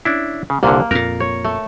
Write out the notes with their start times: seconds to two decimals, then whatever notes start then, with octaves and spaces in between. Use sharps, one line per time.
0.05 C#4 D4 E4
0.50 C#3
0.63 C2 A#2 D3 A#3
0.91 F2 A#2 A#4
1.20 C#5
1.44 A3